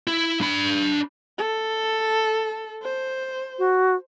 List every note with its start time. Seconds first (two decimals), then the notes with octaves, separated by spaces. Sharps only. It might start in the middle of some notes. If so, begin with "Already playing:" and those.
0.07 E4
0.41 D4 B5
1.38 A4
2.83 C5
3.59 F#4